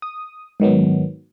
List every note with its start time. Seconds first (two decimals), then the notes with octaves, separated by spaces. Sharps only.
0.02 D#6
0.60 G#2 D#3 F#3 B3